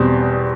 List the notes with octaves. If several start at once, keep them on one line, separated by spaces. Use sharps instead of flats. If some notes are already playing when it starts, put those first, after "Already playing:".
Already playing: E2 B2 G3 C4